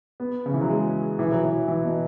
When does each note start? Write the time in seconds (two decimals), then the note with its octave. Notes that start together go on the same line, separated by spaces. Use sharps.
0.20 B3
0.46 C#3
0.54 E3
0.61 F#3
0.69 G#3
1.19 E3
1.32 F#3
1.44 E3
1.68 E3
1.85 B2